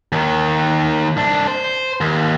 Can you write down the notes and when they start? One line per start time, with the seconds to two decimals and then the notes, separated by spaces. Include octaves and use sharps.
0.12 D#2 D#3
1.17 C2 D4
1.47 C5
2.01 D#2